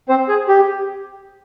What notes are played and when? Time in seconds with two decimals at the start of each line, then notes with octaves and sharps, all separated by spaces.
0.09 C4 C5
0.29 G#4
0.48 G4